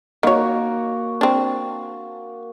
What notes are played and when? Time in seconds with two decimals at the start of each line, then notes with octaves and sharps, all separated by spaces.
0.23 D#3 A#3 F#4 C#5
1.21 C4 D4